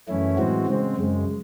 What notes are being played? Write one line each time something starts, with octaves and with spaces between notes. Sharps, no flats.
F#2 E3 A3 C#4 E4
A2 E3 G#3 C4 F#4
C#3 G#3 C4
F#2 C#3 G#3